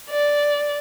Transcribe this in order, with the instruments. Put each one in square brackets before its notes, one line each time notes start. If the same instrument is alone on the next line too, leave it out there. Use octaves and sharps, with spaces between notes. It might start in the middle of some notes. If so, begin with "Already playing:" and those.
[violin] D5